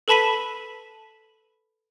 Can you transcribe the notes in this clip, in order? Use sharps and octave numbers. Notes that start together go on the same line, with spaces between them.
A4 B4 A5 B5 B6 D#7